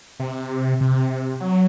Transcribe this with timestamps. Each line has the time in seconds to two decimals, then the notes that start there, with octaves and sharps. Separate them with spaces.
0.20 C3
0.81 C3
1.40 F#3